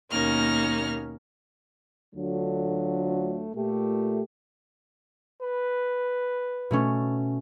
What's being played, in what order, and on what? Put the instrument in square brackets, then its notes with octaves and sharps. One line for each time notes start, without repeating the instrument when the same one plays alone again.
[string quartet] D#2 B2 A#3 C#4 D#4 F6
[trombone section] D2 D3 F#3 A3 D4 F4
A#2 A3 G4
[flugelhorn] B4
[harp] B2 A3 C#4